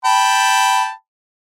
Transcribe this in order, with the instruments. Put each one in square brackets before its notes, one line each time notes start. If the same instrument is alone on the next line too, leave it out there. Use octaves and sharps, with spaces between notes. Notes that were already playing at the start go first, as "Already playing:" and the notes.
[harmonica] G5 A5 B5